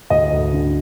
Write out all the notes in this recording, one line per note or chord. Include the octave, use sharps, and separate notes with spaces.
D2 D#5
D2
D3